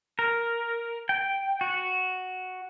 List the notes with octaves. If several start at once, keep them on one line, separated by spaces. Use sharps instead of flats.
A#4
G5
F#4